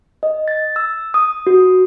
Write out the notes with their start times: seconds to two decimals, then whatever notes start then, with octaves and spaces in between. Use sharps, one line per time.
0.23 D#5
0.48 A6
0.76 E6
1.14 D#6
1.47 F#4